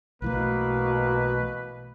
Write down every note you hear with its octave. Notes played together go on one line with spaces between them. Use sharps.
B1 B2 E3 A3 A#3 B4